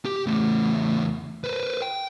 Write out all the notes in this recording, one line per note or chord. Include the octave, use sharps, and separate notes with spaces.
G4
E2 A3
B4 C5
G5